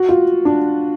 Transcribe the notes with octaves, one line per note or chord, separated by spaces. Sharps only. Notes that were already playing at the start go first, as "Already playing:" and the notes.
Already playing: F#4
F4
D4